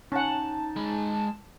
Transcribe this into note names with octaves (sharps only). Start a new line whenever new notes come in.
C#4 D#4 F#5 A5
G#3 B5